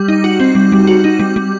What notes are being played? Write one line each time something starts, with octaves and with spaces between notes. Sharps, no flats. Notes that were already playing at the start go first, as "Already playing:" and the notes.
Already playing: G3
D#4
F#4
C4
G3
G3
F#4
D#4
G3
G3